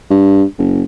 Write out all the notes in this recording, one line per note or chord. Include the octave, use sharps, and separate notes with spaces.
G2
F#1